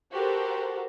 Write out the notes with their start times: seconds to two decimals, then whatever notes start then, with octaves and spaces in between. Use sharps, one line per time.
0.13 F#4 G4 A4 A#4 C5